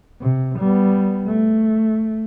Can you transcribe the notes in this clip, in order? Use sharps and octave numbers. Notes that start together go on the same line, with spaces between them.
C3
G3 B3
A3